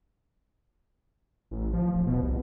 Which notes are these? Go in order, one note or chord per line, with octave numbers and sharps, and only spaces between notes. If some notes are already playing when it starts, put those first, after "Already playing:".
A1
F3
D1
B2
C2